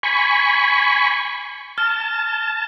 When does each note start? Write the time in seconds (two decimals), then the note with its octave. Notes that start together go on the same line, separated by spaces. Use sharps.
0.03 G#5 B5 C#6
1.78 A5 F6